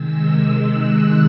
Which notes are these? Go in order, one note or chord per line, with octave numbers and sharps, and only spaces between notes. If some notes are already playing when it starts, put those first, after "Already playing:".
Already playing: C3 D#3 G#3 E6
E6
F#6